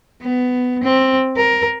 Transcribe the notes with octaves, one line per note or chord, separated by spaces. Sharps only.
B3
C4
A#4